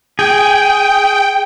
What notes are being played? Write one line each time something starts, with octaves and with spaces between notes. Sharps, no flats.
G#4 G5